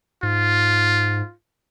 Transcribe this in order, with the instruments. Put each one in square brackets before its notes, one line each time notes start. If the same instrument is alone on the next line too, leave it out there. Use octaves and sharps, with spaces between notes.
[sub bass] G#2 [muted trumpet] F4